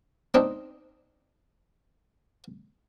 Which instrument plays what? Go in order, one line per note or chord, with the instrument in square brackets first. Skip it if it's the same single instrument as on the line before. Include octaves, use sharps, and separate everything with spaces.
[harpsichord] C4 D4 D#4